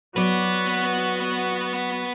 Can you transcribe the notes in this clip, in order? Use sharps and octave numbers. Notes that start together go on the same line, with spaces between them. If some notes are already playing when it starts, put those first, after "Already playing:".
F#3 B3 F#4 B4 D5